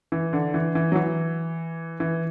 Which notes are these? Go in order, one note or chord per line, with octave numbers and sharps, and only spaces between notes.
E3
D3
E3
E3
F#3
E3
E3